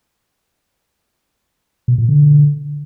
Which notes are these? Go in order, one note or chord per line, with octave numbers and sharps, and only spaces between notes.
B2
A#2
D3